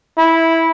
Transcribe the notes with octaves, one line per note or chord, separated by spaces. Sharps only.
E4